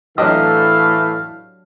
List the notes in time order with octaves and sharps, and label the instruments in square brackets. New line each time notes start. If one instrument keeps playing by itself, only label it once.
[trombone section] A2 E3 A3 [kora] F#3 D4 G4 [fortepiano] D#5 [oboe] F5